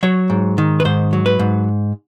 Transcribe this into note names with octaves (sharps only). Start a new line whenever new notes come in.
F#3 C#5
G#2
D#3
B4
G#2 C5
F#3
B4
G#2